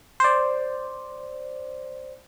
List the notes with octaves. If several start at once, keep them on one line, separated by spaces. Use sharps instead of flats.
C5 D5